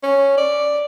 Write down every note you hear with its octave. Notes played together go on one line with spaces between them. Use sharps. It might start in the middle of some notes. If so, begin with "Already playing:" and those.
C#4
D5